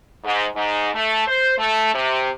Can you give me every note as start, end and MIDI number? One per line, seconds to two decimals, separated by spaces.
0.24 0.45 44
0.56 0.91 44
0.95 1.26 57
1.28 1.54 72
1.58 1.93 57
1.94 2.30 48